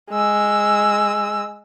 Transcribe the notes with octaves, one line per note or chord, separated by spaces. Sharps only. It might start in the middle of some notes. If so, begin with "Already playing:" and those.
G#3 E6